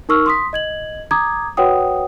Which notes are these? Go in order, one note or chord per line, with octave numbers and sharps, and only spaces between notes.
D#4 A#4 C#6 E6 F6
C6 D#6 B6
D#5 G#6 F#7
A#5 D6 D#6 G#6
F#4 B4 C#5 F#5 G5 D#6